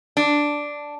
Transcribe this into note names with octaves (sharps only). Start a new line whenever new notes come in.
D4